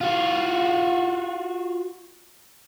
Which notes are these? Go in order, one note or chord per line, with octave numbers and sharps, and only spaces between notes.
F4 F#4